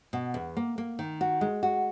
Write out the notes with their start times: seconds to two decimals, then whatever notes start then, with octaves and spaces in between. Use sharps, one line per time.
0.13 B2
0.34 E2
0.57 A#3
0.78 A#3
0.99 D#3
1.21 F#4
1.41 G#3
1.63 F#4